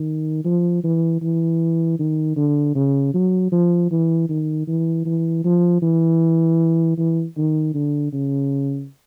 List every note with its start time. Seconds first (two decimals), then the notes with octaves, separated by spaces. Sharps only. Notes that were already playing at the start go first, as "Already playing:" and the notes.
Already playing: D#3
0.45 F3
0.84 E3
1.22 E3
1.99 D#3
2.36 D3
2.75 C#3
3.14 F#3
3.52 F3
3.91 E3
4.29 D#3
4.67 E3
5.05 E3
5.44 F3
5.82 E3
6.98 E3
7.37 D#3
7.74 D3
8.13 C#3